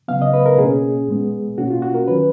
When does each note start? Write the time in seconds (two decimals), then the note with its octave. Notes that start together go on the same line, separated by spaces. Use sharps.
0.08 C#3 F#3 B3 F5
0.22 D#5
0.33 B4
0.46 A#4
0.58 B2 A#3 C#4 G#4
1.08 A#2 G#3 B3
1.58 B2 A#3 C#4 F#4
1.70 F4
1.82 F#4
1.94 A#4
2.07 D#3 F#3 C#4 B4